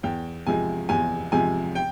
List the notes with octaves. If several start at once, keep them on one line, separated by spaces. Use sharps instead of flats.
E2 G5
C3 F3 G#3 G#5
E2 G#5
C3 F3 G#3 G#5
G5